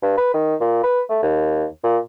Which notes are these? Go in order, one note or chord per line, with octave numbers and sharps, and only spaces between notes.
G2
B4
D#3
A#2
B4
A3
D#2
A#2